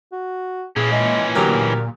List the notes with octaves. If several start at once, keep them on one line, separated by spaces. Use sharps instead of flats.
F#4
A#2 E3 C#4 G#4
G#3
D2 F#3 G4 A#4